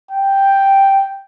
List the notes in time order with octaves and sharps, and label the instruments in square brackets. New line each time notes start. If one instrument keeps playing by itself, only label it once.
[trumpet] G5